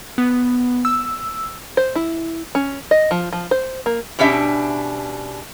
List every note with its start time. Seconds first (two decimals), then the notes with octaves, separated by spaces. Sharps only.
0.18 B3
0.85 E6
1.77 C5
1.95 E4
2.55 C#4
2.91 D#5
3.11 F3
3.33 F3
3.51 C5
3.86 A#3
4.19 B2 C#4 D4 G4 E5